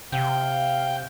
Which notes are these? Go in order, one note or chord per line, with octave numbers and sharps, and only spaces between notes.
C3 F5 G5